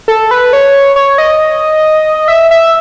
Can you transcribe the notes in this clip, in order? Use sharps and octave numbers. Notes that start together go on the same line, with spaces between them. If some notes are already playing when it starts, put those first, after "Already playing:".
A4
B4
C#5
C#5
D#5
E5
E5